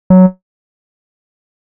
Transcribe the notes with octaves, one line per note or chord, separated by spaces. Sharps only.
F#3